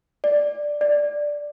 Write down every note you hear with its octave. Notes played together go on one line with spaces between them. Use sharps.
D5
D5